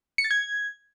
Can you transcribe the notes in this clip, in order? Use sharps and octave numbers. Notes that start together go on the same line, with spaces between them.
C#7
A6
G#6